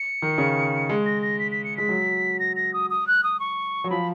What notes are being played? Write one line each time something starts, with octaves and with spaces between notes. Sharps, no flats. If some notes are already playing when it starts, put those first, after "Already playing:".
Already playing: C#7
D#3
C#3
G#3
A#6
A#6
B6
B6
C#7
G#3 B6
F#3
A#6
A#6
D#6
D#6
F#6
D#6
C#6
F#3
F3 B5